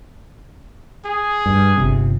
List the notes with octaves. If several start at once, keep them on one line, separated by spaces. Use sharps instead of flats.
G#4
G2
G1 C3